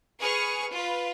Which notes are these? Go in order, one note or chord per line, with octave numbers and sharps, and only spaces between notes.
G#4 B4 C#6 F6
F4 B4